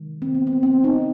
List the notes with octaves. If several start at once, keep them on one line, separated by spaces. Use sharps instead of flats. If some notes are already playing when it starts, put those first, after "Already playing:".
Already playing: C3 D#3 G#3
C4
B3
C4
C4
D#4